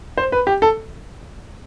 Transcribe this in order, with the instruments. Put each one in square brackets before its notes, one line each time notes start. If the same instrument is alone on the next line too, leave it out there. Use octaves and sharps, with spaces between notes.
[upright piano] C5
B4
G4
A4